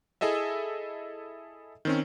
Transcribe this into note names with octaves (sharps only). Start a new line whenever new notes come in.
E4 G#4 A4 D#5 E5
D#3 C4 C#4